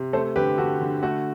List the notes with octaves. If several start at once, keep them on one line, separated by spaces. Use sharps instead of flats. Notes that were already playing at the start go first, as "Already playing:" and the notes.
Already playing: C3
A3 A4 C5
D3 G4 B4
D3 F#4 A4
D3
A3 F#4